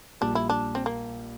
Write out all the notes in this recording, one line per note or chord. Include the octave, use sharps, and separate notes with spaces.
A#1 A#2 G3 D4
E4
D4
C4
A#3